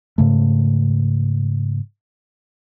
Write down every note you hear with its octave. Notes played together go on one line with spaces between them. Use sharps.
G#2 C#3 A3